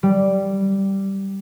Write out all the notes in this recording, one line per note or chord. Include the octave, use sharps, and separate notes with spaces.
G3